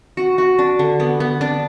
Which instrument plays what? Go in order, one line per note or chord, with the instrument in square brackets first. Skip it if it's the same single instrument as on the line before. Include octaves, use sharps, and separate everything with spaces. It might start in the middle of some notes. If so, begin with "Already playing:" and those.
[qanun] F#4
F#4
D4
D3
B3
B3
D4